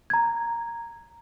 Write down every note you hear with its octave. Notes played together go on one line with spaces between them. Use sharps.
A#5 G#6